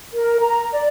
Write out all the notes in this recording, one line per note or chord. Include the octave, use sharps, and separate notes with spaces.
A#4
A#5
D5